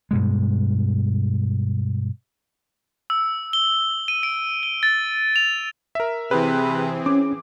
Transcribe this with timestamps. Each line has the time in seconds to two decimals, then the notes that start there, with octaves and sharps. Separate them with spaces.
0.11 G2 B2 G#3
3.10 E6
3.53 G7
4.08 D#7
4.23 D7
4.63 G7
4.83 A6
5.36 F7
5.95 A#4 E5
6.31 C3 E3 C4 G#4 B4
7.06 C#4 D6